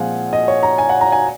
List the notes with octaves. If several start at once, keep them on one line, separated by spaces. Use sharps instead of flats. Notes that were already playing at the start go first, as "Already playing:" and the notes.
Already playing: A#2 F3 G#3 C4 F5 F#5 G#5
D#5
C#5
A#5
G#5
F#5
A#5
G#5